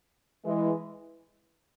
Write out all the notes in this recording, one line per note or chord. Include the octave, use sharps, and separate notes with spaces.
E3 G#3